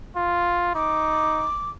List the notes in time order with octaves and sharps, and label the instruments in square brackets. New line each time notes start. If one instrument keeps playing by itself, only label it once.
[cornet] F4
[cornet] D#4 [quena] D6